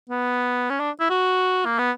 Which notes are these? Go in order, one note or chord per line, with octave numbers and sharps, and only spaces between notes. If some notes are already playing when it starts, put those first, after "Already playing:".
B3
C#4
D4
E4
F#4
A#3
B3